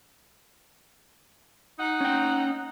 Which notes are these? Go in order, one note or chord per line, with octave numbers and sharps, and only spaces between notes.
D#4 F#5
C#4 G5